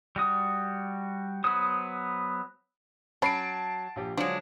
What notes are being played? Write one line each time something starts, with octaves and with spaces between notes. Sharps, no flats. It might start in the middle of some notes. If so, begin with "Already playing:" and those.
G3 F#4 D#6
F#3 B3 C5 D#6
F#3 C#4 C#5 A5 B5 C7 D7
A#1 G4
D3 F3 F#3 G#3 D4